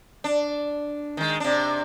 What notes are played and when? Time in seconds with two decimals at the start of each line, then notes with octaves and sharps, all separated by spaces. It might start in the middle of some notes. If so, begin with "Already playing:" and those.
0.24 D4
1.17 D#3 G#3
1.40 C3 D4